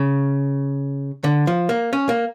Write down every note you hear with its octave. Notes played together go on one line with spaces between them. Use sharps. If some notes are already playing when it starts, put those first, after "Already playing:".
Already playing: C#3
D3
F3
A#3
C#4
A#3